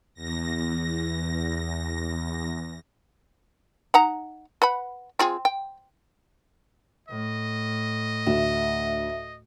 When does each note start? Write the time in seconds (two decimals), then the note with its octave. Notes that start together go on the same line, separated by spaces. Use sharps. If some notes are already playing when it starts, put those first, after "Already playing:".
0.14 E2 A#6
3.94 D#4 F#5 A#5
4.62 B4 F#5 B5
5.19 C4 F4 G#4
5.45 G5
7.09 A2 D#5
8.27 D2 E5